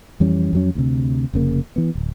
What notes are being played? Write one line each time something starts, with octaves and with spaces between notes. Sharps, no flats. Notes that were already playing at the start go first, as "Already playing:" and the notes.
F2 E3 G3 C#4
F2 F#3 C#4
D2 C3
F1 C#3 A#3
E3 B3
D1